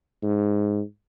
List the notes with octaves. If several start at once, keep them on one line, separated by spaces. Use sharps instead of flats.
G#2